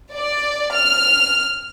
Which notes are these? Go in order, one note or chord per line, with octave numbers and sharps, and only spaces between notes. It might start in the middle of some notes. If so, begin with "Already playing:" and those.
D5
F6